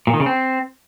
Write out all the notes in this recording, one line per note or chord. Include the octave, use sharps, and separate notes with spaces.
A#2
D#3
C#3
C4